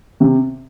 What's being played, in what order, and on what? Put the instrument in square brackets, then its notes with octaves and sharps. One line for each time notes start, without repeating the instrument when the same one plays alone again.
[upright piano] C3